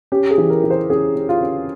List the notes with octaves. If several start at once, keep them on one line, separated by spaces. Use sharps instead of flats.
C#4 G4
G#4
E3
A#4
E3
C5
C#4 G#4
C#4
F4
C#4